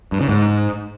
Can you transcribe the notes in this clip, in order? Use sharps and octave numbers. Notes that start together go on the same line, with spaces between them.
G2
C#3
G#2